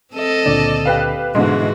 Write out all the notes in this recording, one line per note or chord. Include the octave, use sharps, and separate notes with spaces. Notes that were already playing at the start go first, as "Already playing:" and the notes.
C4 A4 D#5
C#2 A#2 D3 D5
G4 B4 F5
C2 G#2 B2 D3 E3 G#3 F#4